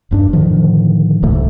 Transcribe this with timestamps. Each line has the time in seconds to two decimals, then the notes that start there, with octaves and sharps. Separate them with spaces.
0.11 F1 G2 D4
0.33 A2 D3 D#3 F3
1.22 D1 C2 G#2 A3